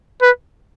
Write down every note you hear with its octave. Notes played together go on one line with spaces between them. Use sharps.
B4